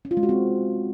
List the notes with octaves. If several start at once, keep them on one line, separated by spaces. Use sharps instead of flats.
C#4
F4
G#3
F#4
C4